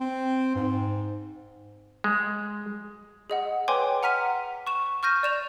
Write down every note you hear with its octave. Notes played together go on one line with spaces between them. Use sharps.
C4
G#2
G#3
G#4 D#5 F#5
B4 C#5 G5 G#5 C6 D6
F#5 A#5 F6 B6 D#7
C#6 E7
C#6 F6 G6 A#6 D#7
D5 E7 F7